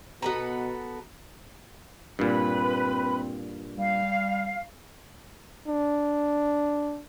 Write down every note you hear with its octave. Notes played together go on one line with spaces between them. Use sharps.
B2 B3 F#4 A4 B4 A#5
G2 A#2 C4 B4 B5
G3 F5
D4